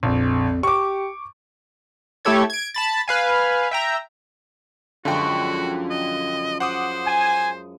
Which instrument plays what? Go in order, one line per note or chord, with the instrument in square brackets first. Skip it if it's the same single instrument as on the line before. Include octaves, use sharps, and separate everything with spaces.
[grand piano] A#1 [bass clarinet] F2
[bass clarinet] G4 [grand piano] C#6 D6
[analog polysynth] A3 E4 G4 A4 C#5 G#6
G#6 D7
A5 B5 A6
B4 F5 G#5
E5 G5 A#5
[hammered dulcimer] F#2 F3 G#3 [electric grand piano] D3 G5 [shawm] F#4
[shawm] D#5
[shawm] C5 [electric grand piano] F#5 D6 D#6
[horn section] G#5